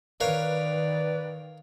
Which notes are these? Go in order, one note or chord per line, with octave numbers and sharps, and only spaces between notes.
D#3 A#4 B4 C#5 D5 F5